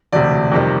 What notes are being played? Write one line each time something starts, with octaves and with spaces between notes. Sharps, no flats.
E1 D2 C3 D5
F2 C3 D#3 G3